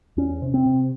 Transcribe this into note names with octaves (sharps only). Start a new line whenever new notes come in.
E2 C#4
C3
C4
C3